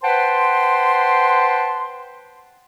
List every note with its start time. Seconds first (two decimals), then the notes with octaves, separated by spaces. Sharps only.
0.03 B4 C5 F#5 G5 A5 C6